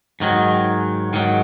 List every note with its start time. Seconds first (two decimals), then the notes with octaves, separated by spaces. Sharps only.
0.20 G#2 D#3 F#3
1.13 G#2 D#3 F#3